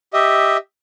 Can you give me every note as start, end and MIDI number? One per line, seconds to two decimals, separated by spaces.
0.13 0.57 67
0.13 0.57 75
0.13 0.57 76